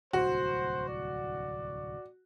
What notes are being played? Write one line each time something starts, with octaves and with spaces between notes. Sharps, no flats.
D1 C2 F#4 C5
D5